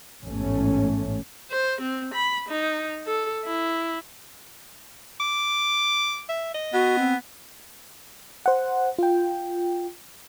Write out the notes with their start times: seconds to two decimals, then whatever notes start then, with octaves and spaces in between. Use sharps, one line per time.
0.23 A1 E2 G#2 A3 C#4
1.50 C5
1.81 C4
2.14 B5
2.49 D#4
3.06 A4
3.45 E4
5.20 D6
6.29 E5
6.54 D#5
6.73 B3 F#4
6.98 C4
8.46 C5 F#5
8.98 F4 G5